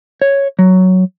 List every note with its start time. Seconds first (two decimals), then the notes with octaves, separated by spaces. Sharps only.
0.22 C#5
0.59 F#3